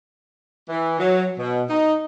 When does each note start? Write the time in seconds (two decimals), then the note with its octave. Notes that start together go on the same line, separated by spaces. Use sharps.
0.69 E3
0.98 F#3
1.39 B2
1.69 D#4